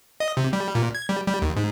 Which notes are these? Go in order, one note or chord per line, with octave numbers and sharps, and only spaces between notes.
D#5
C3
G3
A#2
G#6
G3
G3
D#2
G#2